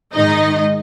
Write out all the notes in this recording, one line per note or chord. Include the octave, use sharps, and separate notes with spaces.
G#2 D#3 G#3 D#4 D#5